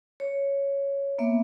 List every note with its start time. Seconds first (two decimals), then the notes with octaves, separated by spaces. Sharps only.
0.20 C#5
1.18 A#3 B3 E5